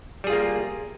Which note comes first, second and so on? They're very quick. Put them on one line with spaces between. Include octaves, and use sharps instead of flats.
G3 G#4 F4 A#3